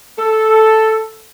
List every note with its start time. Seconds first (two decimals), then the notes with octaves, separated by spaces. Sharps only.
0.19 A4